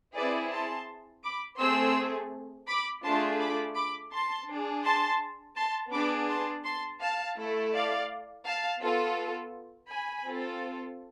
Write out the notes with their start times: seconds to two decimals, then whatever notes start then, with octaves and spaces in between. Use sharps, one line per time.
0.16 C4 E4 G#4 B4 D5
0.52 A5 C6
1.24 B5 D6
1.59 A3 C4 G#4 C6 E6
2.68 B5 D6
3.04 A3 D4 F4 G#4 A5 C6
3.40 B5 D6
3.76 B5 D6
4.12 A5 C6
4.48 D4 G#4
4.84 A5 C6
5.56 A5 C6
5.92 B3 D4 G#4 B5 D6
6.28 A5 C6
6.65 A5 C6
7.00 F5 A5
7.37 A3 E4 A4
7.73 D5 F5
8.45 F5 A5
8.81 B3 F4 A4
9.89 G#5 B5
10.25 C4 F4 A4